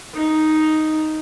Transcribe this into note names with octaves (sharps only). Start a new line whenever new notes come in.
D#4